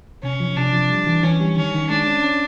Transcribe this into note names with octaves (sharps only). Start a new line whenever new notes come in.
C3 C#4
F3
C3 D4
F3
G3
E3
E3 C#4
G3
D#3 C#4
D#3
G#3 D4
C#4
C#4